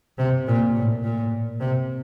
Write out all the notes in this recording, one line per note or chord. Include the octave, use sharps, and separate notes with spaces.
C3
A#2
A2
A#2
C3